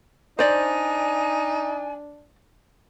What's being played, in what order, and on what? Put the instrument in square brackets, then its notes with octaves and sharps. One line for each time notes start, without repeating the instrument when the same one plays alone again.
[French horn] D4 [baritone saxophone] D#4 [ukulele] C5 D5 [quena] G#5